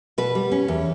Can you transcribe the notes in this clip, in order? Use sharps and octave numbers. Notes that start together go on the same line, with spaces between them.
B2 B4
G3
C#4
E2